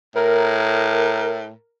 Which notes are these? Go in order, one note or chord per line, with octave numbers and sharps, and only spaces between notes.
A2 A#4